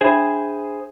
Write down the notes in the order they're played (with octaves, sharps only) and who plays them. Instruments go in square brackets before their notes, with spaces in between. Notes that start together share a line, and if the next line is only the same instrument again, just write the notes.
[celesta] D4 E5 B5 [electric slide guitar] G#4 C5 G#5